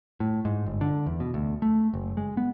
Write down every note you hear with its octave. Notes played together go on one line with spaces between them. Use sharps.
A2
G#2
G1
D3
E2
B2
D2
A3
F#1
G#3
B3